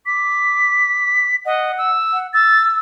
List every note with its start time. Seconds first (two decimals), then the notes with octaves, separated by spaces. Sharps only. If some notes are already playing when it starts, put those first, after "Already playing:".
0.06 D6 B6
1.46 D#5 F#5
1.78 E6
2.13 F#5
2.34 E6 A6